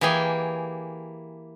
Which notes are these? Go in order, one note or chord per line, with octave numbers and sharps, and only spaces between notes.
E3 A#3 G4 G#4 G5 G#5